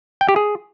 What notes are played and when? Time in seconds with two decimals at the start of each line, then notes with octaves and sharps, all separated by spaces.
0.21 G5
0.29 G4
0.36 G#4